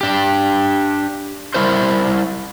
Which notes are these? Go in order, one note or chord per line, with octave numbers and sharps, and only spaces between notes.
D4 G4
G3 E4 A#4 C5